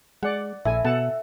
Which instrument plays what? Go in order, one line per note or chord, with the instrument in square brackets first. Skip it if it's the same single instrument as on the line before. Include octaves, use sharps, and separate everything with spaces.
[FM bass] G#3 [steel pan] D5 F#5
[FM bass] A#1 [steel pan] E4 A4 G#5 [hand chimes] E5
[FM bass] B2 [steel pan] A4 F#5 A5